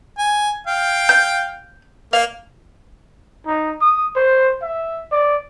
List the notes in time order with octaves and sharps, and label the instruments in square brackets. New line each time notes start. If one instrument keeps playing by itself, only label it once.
[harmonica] G#5
F5 G5
[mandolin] G6
[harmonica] A#3 [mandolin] F5
[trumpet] D#4
D#6
C5
E5
D5